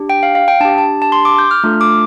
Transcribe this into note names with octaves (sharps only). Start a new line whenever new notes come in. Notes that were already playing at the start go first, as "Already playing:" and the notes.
Already playing: D4 G4
G5
F5
F5
G5
D4 G4 A5
A5
A5
C6
D6
G6
F6
A3 D4 F4 A4 F6
D6